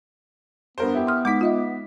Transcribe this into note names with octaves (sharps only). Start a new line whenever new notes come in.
G2 B3 A#4 C5
E4 G4
C6 D#6 F6
G#3 D#4 D6 B6
F4 D#5 E5